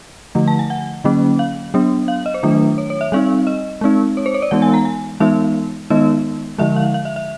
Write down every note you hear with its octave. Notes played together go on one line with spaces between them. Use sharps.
D3 F3 A3
A5
G#5
F#5
D3 F#3 A#3 C#4
F5
F#3 B3 D4
F5
D#5
C5
D#3 F#3 A3 D4
C#5
C#5
E5
G3 C4 D#4 F5
D#5
G#3 C4 D#4
C#5
C5
C#5
D5
E3 G#3 B3 D#4 F#5
G#5
A#5
G#5
E3 G#3 B3 D#4 E5
D#3 G#3 B3 D#4 D#5
D3 F3 G#3 E5
F5
F5
E5
E5